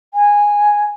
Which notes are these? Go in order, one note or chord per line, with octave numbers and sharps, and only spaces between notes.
G#5